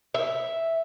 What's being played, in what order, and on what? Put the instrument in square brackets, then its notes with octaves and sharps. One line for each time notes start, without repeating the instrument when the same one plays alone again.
[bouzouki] E5